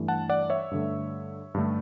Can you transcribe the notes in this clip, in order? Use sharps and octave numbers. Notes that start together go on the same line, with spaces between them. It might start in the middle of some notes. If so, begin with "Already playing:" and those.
Already playing: G2 E3 A3
F#5 A5
D5 F#5
C#5 E5
G2 D3 A3
G2 D3 A3